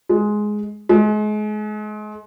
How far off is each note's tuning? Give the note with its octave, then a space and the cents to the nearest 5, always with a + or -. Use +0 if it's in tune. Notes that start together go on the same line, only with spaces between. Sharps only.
G#3 +10
G#3 +35